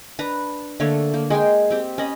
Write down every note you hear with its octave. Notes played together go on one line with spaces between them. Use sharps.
D4 B4 A#5
D3 A3 A#3 C#5
A#3
G#3 G#4 G5 C6
C4 G4
C#4 D#5 B5